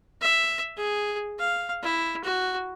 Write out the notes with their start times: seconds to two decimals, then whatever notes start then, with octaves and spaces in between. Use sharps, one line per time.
0.21 E5
0.77 G#4
1.39 F5
1.83 E4
2.24 F#4